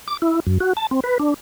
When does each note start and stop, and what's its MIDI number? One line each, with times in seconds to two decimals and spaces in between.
0.08 0.17 86
0.22 0.40 64
0.47 0.58 42
0.60 0.73 66
0.77 0.87 81
0.91 1.00 60
1.04 1.18 71
1.20 1.34 62